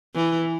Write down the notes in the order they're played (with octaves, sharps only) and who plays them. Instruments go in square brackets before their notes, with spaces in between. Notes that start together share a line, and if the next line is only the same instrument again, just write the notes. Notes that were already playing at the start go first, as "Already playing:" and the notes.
[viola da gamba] E3